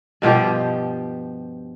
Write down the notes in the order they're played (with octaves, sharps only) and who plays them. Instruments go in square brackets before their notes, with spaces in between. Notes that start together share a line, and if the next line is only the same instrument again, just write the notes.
[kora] G2 B2 F3 G4